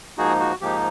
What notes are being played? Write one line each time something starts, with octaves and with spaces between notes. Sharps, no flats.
G#2 F3 A#3 D#4 F#4 G#4
F#4
G#2 F3 A#3 D#4 G4